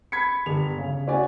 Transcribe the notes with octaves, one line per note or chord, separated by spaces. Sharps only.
B5 G#6 B6 C#7
G1 F7
C#3
C#4 F#4 C#5 D5 G#5